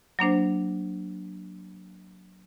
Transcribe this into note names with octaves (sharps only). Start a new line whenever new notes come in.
F#3 A#3 D4 C5